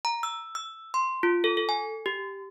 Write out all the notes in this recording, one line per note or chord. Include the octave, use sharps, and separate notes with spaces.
A#5
E6
E6
C6
F4
A4
A4
G#5
G4